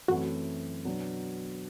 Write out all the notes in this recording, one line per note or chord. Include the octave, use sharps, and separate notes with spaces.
F#2 E3 A3 C4 E4 F#4
B2 F#3 B3 D4